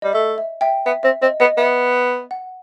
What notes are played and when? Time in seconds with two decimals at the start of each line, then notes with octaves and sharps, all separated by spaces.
0.02 G3 D#5
0.13 A3 E5
0.38 E5
0.61 E5 G5
0.86 B3 E5
1.03 C4 E5
1.22 C4 D#5
1.40 B3 D#5
1.57 B3 E5
2.31 F#5